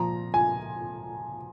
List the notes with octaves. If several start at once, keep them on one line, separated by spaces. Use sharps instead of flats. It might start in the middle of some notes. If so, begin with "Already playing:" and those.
Already playing: A#2 F3 A#5
G#5